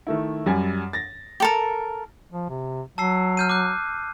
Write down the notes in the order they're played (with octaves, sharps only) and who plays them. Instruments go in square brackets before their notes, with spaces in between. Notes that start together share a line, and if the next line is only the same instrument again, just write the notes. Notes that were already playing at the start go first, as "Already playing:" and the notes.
[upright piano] D#3 A3 E4
F#2 G3 G#5
A6 A#6
[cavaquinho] G4 A4 A#4
[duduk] F3
C3
[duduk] F#3 [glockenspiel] A5 E6 C7
[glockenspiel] F6 G6 D#7
D6 F#6